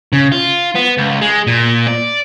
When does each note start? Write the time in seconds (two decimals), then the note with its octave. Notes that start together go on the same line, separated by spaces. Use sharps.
0.13 C#3
0.32 F4
0.75 B3
0.97 C#2
1.21 G#3
1.47 A#2
1.87 D5